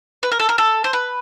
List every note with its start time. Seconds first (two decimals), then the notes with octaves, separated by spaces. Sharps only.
0.23 B4
0.31 A#4
0.40 A4
0.49 A#4
0.58 A4
0.84 C5
0.93 B4